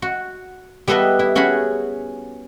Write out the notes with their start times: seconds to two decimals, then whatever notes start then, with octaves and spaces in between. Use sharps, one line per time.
0.02 F#4
0.88 G3 B3 A4 B4 D#5 E5
1.19 E4
1.35 C#4 F#4 G#4 G#5 B5